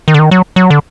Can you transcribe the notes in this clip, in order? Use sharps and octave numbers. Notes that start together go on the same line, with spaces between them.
D#3
D3
D#3
F#3
F#3
D3